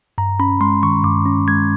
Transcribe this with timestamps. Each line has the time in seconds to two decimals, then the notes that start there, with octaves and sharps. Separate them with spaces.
0.18 G2 A#5
0.39 C#4 B5
0.61 G#3 C6
0.83 D#3 C#6
1.04 G2 D6
1.26 C#4
1.48 G#3 G#6